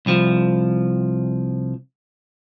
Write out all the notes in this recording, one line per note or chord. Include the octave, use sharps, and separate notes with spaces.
C2 F3